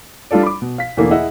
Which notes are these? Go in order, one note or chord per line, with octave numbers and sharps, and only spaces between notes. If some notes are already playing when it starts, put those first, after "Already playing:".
G3 D4 F4 A4 D5
B5 D6
B2
F5 B6
E2 B2 D3 E3 A3 A#3
E4 G#4 D#5 E5 F#5 E6